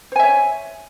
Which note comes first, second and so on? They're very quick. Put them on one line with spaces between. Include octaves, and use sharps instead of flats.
C5 G#5 E5 C#5